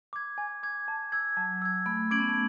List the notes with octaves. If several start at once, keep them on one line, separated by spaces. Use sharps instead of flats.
D6 G#6
G#5
D6 G#6
A5
E6 G#6
F#3 A5
E6 G#6
A3 B5
C#4 D6 G#6 D7 F#7
B3
A3